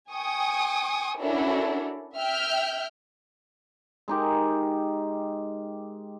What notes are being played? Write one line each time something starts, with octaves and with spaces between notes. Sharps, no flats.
G5 G#5 C#6 D#6
C#4 D4 E4 F#4 A4 A#4
E5 G5 F6 G6
G#3 D#4 G4 A#4